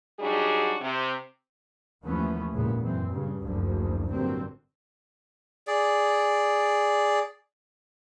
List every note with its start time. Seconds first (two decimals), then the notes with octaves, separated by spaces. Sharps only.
0.19 F#3 G3 D4 D#4 F#4 G#4
0.80 C3
2.03 D#2 E3 F3 A3 B3 C#4
2.52 G#1 E2 G2 A#2 C#3 B3
2.80 F#2 E3 C4
3.09 G2 C#3
3.42 F#1 D2 D3 F3
4.09 A1 G2 D3 F#3 A#3 C4
5.67 G#4 D5